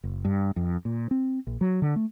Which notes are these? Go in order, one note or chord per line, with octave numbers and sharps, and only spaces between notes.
F#1
G2
F2
A#2
C4
A#1
F#3
D3
A3